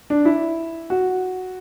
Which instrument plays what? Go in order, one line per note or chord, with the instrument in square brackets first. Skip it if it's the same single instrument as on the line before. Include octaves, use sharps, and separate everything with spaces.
[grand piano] D4
E4
F#4